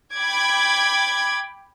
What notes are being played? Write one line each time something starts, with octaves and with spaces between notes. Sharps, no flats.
G5 B5 D6 G#6